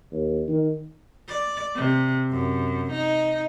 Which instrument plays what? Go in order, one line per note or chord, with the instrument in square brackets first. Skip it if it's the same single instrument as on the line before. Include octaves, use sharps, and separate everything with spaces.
[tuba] D#2
D#3
[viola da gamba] D5
C3
F#2
D#4